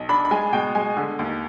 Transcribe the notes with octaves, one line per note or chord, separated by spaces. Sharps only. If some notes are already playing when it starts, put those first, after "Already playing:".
Already playing: B1
D4 B5
B5
G#3 G#5
B2 G5
G#3 G#5
D3
D#2